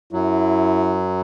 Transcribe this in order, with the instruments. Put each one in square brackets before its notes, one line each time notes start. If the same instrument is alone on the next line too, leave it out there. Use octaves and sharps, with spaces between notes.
[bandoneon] F#2 F#3 [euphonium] E4